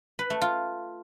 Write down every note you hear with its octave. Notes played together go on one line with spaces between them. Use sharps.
B4
A3
F4